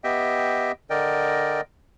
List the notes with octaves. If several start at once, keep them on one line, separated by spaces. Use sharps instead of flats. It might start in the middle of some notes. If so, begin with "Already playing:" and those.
B3 G4 D#5 E5 G5
D3 A#4 D5 D#5 G5